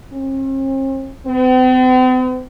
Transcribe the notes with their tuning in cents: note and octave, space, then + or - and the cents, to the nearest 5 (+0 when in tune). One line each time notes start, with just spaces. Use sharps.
C4 +45
C4 -45